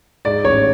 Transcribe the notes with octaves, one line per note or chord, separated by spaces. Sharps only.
G#2 D5
A1 C#5